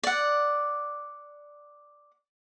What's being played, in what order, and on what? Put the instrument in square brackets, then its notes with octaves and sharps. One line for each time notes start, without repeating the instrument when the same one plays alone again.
[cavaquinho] D5 F#5